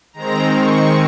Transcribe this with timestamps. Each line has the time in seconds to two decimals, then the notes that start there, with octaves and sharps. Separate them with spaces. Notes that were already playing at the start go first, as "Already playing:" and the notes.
0.13 D#3 G#3 C4 A#5
0.56 C#6